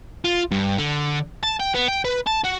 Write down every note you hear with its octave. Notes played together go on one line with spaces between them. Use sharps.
F4
G2
D3
A5
G5
B3
G5
B4
A5
F#4